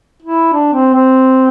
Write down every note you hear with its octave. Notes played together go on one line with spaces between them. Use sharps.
E4
D4
C4
C4